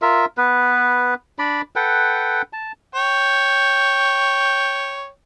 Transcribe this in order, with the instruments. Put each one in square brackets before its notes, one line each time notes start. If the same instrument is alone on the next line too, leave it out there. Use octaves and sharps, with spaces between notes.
[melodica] F4 A#4 E5
B3 B4
D4 D5 B5
A4 B4 F#5 G5
A5
[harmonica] C#5 G5